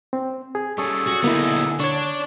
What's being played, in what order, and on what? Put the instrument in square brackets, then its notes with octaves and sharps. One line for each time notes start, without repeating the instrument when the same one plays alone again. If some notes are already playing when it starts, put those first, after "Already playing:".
[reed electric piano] C4
G#4
[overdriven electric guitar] G3 C#4 [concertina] G#4 A4 [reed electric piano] C#6
[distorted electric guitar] F#4
[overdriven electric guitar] D2 [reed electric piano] A#3 E4 [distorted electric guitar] B3 D#4
[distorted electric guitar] D4 [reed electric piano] C#5 C#6